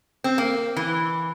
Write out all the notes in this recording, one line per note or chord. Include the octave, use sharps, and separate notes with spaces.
C4
A#3
E3